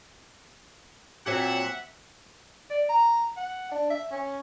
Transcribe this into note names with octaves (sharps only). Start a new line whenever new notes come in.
A#2 F#3 C4 E5 F#5
D5
A#5
F#5
D4
E5
C#4